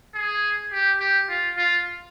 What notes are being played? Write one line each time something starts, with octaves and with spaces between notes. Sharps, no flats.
G#4
G4
G4
F4
F4